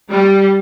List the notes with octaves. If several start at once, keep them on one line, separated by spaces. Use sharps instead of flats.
G3